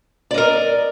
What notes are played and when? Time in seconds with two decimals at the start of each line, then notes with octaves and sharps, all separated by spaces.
0.31 D5
0.34 D#5
0.38 A#4